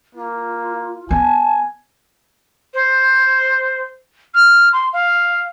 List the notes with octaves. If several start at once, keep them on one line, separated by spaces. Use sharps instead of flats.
A#3 F4
B3 G#5 A5
C5
F6
C6
F5